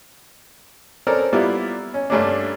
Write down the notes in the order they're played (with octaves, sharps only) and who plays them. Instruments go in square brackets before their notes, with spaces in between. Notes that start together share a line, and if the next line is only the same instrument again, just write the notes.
[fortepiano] C4 C#4 A4 A#4 D5
G3 A#3 B3 E4 F4 D5
C#4
G2 G3 A3 A#3 C#4 D4